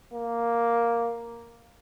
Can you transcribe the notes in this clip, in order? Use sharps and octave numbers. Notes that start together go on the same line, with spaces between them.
A#3